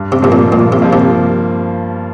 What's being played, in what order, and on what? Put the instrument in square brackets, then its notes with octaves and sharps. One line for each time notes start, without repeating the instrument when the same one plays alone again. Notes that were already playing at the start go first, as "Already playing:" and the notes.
Already playing: [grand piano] G2
[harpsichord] C3
[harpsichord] C3 [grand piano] F3 A#3
[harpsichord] A#2
[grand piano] G2 [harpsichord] A#2
[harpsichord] C3
[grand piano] F3 A#3
[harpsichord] C3